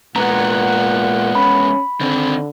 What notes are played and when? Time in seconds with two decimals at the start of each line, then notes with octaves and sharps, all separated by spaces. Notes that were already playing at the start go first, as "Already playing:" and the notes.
0.16 A#2 G#3 B3 F#5 A#5
1.35 C#4 B5
2.01 D3 D#3 C4